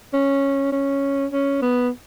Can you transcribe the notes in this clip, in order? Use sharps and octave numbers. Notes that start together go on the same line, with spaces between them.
C#4
C#4
C#4
B3